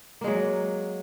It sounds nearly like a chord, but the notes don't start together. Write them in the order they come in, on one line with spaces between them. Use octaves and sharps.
A#3 G#3 F#3